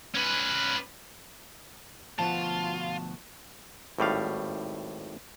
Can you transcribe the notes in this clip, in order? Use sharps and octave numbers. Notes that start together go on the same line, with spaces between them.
C#4 B4
D2 B2 F3 F4 F#4 F#5 A5
G#1 A2 G3 F5